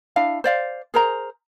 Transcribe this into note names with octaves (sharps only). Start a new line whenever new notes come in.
D4 E4 F5
C5 D5 F5
G#4 A#4 C5 A#5